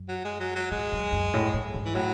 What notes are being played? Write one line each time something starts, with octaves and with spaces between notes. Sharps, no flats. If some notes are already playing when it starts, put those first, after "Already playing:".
Already playing: F#2
F#3
G#3
F#3
F#3
G#2 G#3
F#2
F#2
A2
A2
G#2
E3
A2 F#3